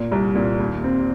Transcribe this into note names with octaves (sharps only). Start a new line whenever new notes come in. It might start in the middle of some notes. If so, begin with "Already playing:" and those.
Already playing: A#2
C2
A#2
D#2
C4